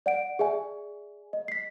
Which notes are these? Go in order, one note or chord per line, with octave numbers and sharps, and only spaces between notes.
D5 F#5 D7
G#4 D5 E5 G#5
D#5
B6 C7